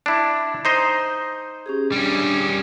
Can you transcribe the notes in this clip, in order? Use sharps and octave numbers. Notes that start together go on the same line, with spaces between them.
D4 E4
D#4 C5 D#5
C#4 G4 G#4
G3 C#4 D4